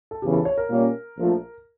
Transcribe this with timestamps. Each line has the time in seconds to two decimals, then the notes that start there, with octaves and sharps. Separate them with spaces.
0.11 A4
0.22 E2 C#3 E3 G4
0.33 A4
0.45 C#5
0.57 A#4
0.70 A#2 G3 A#3 C#4
1.17 A#1 A#2 F3 A3